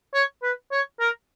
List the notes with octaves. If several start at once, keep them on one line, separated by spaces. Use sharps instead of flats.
C#5
B4
C#5
A#4